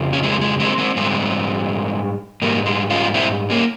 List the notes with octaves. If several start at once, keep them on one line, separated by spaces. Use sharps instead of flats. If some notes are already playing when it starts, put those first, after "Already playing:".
Already playing: F2 C#3 F3
C#4
G#3 C4
G#3
G#3 C4
G#3 C4
G#2 G3 G#3 C4
G#2 G3 A#3
G#3
C#4 F4
C4 E4
A#3 C#4